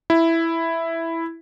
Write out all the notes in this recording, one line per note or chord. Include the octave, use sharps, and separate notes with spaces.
E4